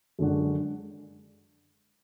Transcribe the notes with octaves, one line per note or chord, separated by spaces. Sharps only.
F#2 D3 G#3 D4 F#4